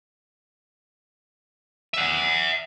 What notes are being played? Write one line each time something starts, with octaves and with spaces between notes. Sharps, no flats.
E5 F#5